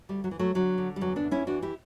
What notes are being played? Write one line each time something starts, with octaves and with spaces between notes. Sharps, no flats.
D2 G3
F#3
E3
F#3 A3
D3 F#3
D3
G3
E2 F#3
B3 D4
E2
C#4 E4
E3 D4 F#4
E4 G4